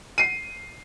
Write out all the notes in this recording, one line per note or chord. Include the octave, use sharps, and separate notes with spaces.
C7 D#7